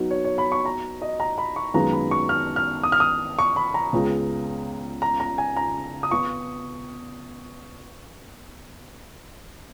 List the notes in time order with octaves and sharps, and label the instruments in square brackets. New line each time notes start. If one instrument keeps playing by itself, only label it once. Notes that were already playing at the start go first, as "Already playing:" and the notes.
Already playing: [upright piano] F#3 B3 D#4 F#4
[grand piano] C#5
C#5
B5
C#6
A#5
D#5
A#5
B5
C#6
[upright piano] F#2 D#3 G#3 B3 F4 [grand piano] A#5
[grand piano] B5
C#6
F6
F6
D#6
F6
D#6
C#6
B5
A#5
[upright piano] C#2 C#3 G#3 B3
[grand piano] A#5
A#5
G#5
A#5
D#6
[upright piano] B3 F4 [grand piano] C#6